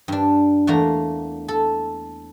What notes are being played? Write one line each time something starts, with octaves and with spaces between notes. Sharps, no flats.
G2 D4
E2 A3 A#3 A#4 A#5
A4